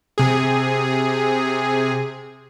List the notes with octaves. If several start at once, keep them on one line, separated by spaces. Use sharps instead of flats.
C3 G#4